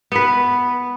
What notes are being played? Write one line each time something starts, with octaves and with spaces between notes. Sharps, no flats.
B3 B4